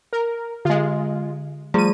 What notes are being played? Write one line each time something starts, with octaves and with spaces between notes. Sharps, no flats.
A#4
D3 G#3 F4
F3 G3 A3 G#4 D#7